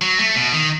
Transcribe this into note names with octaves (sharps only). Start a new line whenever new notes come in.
F#3
A3
B2
D#3